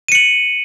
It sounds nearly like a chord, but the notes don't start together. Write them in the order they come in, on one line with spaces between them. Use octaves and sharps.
D#7 C#7 F#7